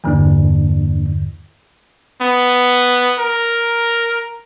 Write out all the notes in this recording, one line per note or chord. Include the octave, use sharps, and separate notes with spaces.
E2 G2 D3 E3 A#3 D4
B3
A#4